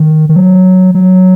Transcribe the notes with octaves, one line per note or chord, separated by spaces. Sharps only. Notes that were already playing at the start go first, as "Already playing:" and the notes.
Already playing: D#3
D#3
F#3
F#3